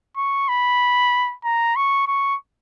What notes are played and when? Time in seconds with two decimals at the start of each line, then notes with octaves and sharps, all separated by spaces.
0.17 C#6
0.49 B5
1.44 A#5
1.76 C#6
2.08 C#6